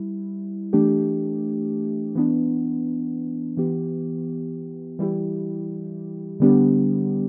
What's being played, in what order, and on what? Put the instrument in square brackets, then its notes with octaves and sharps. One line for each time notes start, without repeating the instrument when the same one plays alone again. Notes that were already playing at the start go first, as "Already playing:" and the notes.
Already playing: [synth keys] G3 E4
E3 A3 D4 G4
E3 B3 D4
E3 B3 G4
E3 G3 E4 G4
D3 G3 B3 D4 G4